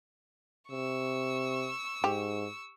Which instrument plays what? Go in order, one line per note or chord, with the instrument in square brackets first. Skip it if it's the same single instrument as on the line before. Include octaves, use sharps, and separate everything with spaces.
[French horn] C3 [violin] C#6 E6
[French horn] G#2 [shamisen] G4